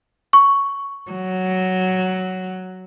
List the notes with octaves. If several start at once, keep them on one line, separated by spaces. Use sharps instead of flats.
C#6
F#3